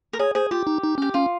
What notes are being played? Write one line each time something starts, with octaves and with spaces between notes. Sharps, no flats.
A#4
G#4 C#5
G#4 C5
F4 G4
D#4
D#4
C#4 G4
C#4 F4